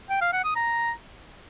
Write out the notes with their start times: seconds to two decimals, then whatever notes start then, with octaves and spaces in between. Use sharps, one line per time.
0.10 G5
0.21 F5
0.33 F#5
0.44 D#6
0.56 A#5